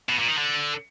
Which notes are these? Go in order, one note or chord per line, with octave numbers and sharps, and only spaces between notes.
B2
A#2
D#3
D3